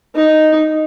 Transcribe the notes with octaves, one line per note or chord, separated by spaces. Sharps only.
D#4